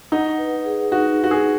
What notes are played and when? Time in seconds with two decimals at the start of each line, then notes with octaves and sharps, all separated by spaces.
0.12 D#4 F#5
0.38 B4
0.65 G#4
0.91 D#4 F#4
1.18 F#5
1.24 F#4
1.31 G#4